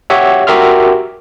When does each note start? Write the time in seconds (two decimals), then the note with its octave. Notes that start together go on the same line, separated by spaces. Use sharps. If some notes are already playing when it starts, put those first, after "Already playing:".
0.10 G4 C#5 E5 F#5
0.47 F#4 G4 A#4 E5 C6 F6